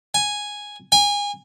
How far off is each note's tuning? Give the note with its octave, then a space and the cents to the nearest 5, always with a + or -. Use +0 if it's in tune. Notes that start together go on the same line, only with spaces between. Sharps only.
G#5 -5
G#5 -30